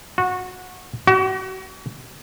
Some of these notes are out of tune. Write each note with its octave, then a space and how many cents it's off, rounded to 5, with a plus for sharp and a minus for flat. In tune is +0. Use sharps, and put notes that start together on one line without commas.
F#4 -20
F#4 +35